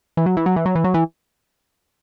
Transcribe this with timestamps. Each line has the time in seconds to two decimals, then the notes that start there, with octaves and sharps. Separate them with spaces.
0.17 E3
0.26 F#3
0.37 E3
0.46 F#3
0.56 E3
0.65 F#3
0.75 E3
0.84 F#3
0.94 E3